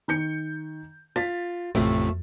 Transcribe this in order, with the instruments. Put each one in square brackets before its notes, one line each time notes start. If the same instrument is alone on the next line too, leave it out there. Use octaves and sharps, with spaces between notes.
[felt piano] D#3 G6 C#7
[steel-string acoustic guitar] F4 [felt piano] A6 B6
[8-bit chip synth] A1 A2 C3 [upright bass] F2 [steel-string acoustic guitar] F3 A3